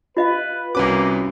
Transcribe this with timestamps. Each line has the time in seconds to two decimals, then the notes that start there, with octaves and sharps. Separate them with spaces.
0.17 F4 B4 D#5 F5
0.75 C2 A#3 C#4 F#4 B4 D6